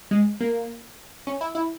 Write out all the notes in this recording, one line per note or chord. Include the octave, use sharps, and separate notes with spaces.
G#3
A#3
C#4
E4
E4